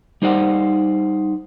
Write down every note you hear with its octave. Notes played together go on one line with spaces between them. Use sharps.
G3 D#4 C5 D5 F#5